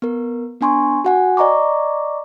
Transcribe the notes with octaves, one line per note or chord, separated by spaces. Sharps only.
B3 A#4
B3 D4 G#5 C6 C#6
F#4 F#5 G#5
D5 D#5 A#5 C#6 D6